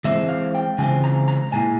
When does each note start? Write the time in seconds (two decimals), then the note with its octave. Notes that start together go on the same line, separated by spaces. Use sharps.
0.04 E3 G#3 C4 E5
0.29 F5
0.55 G5
0.78 C#3 E3 G#3 C4 F4 G#5
1.04 A#5
1.28 A#5
1.52 A#2 G#3 E4 G#5